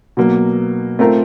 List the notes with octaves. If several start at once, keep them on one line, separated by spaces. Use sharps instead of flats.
B2 F#3 A#3
A3 C4 F4 A#4